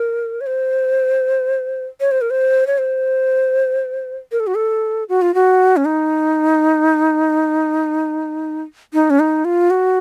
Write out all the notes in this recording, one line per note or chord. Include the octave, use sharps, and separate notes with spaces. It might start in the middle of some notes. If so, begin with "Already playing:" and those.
Already playing: A#4
C#5
C5
C#5
C5
A#4
C5
C#5
C5
A#4
A4
F#4
A4
F#4
F4
F#4
C#4
D#4
D#4
C#4
D#4
F4
F#4